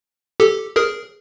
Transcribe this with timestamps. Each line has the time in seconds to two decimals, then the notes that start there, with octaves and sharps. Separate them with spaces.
0.40 G4 A4
0.76 G#4 A#4